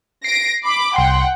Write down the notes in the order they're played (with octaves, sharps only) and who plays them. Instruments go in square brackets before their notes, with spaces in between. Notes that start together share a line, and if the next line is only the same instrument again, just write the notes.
[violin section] A#6 D7 [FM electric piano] C7
[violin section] B5 D6
[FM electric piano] C2 C6 [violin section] F#5 G5